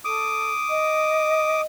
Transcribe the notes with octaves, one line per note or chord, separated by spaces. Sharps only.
A4 D6 D#6
D#5